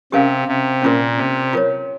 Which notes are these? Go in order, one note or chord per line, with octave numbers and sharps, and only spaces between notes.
C3 C#4 G4 A#4 F5 G#5
C3
A#2 C#4 F4 A#4
C3
F4 A#4 C#5